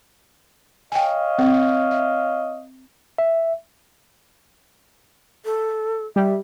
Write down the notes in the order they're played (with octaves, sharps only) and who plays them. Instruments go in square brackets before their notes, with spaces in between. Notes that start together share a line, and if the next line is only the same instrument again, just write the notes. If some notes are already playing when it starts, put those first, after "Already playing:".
[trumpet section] C#5 D#5 F5 [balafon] G5 G#5
[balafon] C4
E5
[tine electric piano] E5
[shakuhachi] A4
[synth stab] G3 [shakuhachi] E5